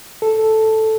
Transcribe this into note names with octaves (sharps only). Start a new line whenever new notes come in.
A4